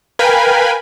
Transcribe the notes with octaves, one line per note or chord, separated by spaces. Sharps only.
A#4 B4 F5 G5 G#5 B5